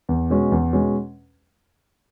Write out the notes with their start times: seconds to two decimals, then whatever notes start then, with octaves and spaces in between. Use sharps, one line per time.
0.09 E2
0.30 B2 G#3 C#4
0.52 E2
0.73 B2 G#3 C#4